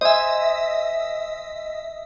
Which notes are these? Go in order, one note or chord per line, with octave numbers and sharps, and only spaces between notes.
C5 D#5 E5 G#5